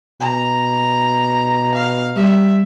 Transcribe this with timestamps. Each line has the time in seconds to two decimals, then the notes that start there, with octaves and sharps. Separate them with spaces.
0.21 B2 A#5
1.75 F5
2.16 G3 E5